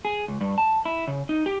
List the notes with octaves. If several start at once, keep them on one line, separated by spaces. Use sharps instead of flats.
G#4
C#2
G2
A5
E4
C#3
D#4
G4